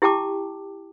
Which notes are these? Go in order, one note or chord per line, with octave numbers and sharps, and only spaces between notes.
E4 G4 G5 A5 D6